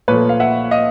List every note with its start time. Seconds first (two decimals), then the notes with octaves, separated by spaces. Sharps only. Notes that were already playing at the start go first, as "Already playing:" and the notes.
0.08 A#2 F3 A3 B4 C#5
0.29 F5
0.40 E5 F#5
0.71 D#5 F5